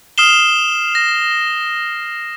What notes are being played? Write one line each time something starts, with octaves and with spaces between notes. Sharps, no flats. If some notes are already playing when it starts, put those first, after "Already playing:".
D#6 F6 C7 E7 G7
A#6